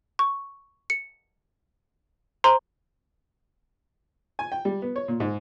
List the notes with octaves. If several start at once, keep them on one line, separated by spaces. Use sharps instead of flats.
C#6
C#7
C5 A#5 C6
G#5
G5
G3
B3
C#5
A#2
G#2